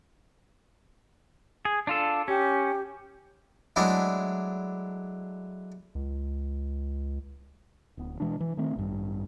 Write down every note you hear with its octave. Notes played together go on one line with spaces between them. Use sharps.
G#4
D4 F4 A4
C#4 G4
F#3 G#3 A3 D4 E4
C#2
D1 B3
B2 E3 G#3 D4
E3
D#3 A3 C4
A1 G2